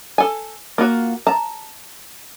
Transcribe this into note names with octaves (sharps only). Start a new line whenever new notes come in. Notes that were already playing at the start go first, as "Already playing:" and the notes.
A4 G#5
A#3 F4 F#4
A5 A#5